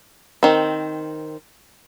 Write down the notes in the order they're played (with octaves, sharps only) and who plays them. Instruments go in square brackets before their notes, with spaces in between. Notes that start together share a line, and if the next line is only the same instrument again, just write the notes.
[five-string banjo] D#3 C4